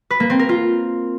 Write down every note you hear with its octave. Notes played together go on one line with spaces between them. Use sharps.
B4
A#3
C4
A#4
F4